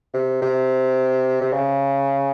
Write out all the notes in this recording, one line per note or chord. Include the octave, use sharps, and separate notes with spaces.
C3
C3
C3
C#3